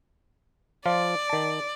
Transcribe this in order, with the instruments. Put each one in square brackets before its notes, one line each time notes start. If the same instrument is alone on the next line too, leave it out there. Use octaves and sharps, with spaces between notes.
[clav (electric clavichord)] F3 F4 [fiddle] D5
[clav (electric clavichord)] D#3 A5